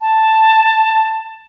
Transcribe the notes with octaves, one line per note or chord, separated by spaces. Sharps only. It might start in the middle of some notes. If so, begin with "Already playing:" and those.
A5